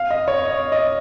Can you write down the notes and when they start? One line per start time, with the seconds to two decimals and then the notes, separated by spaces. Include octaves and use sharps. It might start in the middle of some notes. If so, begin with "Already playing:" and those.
Already playing: F5
0.10 D#5
0.28 C#5
0.45 D#5
0.72 D#5